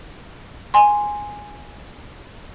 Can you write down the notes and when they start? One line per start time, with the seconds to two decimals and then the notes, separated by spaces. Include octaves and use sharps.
0.74 G#5 C6